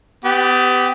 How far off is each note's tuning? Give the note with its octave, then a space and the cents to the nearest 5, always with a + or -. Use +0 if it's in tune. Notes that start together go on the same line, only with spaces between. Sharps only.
B3 +30 G4 +0